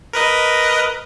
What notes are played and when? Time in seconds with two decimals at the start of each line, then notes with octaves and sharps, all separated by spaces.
0.13 A#4 B4 D#5